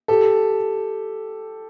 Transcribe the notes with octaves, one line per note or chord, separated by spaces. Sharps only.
G4 A4